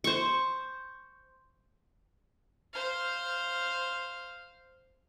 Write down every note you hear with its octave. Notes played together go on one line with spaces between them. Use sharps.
C5 C#6
C5 F5